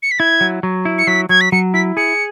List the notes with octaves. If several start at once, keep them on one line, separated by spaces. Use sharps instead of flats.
C#7
B6
E4 G#6
F#3
F#3
E4
C#7
F#3 B6
F#3 G#6
B6
F#3 C#7
E4 B6
G#4 C#7